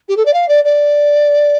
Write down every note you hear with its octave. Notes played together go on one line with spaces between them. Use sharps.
G4
A4
D5
F5
D5
D5